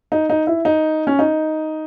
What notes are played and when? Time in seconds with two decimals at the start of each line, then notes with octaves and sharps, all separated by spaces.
0.12 D#4
0.30 D#4
0.47 E4
0.65 D#4
1.07 C#4
1.19 D#4